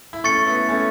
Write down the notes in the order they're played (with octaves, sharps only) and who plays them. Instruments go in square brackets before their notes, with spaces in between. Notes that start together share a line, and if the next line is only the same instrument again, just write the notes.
[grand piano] E4
[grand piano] A3 C#4 [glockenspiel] C#6 A6 C#7
[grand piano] B3 E4
A3 C#4